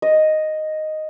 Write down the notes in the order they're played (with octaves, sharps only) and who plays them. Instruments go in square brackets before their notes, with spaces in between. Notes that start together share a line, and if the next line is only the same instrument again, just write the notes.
[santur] D#5